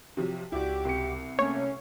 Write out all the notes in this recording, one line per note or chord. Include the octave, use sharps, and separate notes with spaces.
C3 F3 F#3
C#2 E4 F#4 G4 D5 D6
C2 C#7
C3 A3 A#3 C#4 C#5